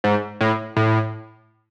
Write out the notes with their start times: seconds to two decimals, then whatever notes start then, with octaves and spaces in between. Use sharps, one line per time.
0.04 G#2
0.41 A2
0.76 A2